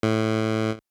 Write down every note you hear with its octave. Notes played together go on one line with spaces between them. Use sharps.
A2